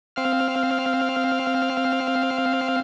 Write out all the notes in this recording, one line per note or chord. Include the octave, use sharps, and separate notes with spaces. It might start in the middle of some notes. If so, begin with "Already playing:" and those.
C4 F5 F6